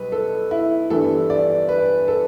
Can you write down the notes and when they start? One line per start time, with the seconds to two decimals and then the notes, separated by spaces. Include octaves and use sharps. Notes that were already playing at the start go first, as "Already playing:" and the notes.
Already playing: B1 G3 B4
0.12 A4
0.51 E4
0.90 G1 G2 E3 G3 A4
1.30 D5
1.69 B4
2.08 A4